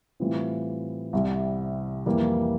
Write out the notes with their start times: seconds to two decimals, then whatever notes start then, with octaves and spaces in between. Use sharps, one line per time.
0.20 A2 E3 G3 C4 F4
1.13 C2 C3 G3
2.06 F2 E3 G3 A#3